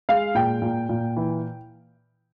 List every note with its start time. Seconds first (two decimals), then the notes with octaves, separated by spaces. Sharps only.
0.09 G#3 F5
0.35 A#2 G5
0.62 A#2
0.89 A#2
1.16 E3